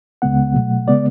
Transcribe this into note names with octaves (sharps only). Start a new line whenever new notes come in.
C#2 C#3 G#3 B3 F#5
B2 F#3 A3
C#3 G#3 B3 D5